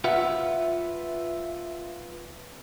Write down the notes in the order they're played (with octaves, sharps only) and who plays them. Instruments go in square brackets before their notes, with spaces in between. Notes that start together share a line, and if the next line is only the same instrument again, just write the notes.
[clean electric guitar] F4 B4 F#5 [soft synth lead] E5